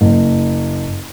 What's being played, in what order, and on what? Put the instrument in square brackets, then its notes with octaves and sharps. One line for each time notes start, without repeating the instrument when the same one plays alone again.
[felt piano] F#1